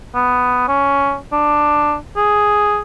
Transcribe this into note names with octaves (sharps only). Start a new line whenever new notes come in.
B3
C#4
D4
G#4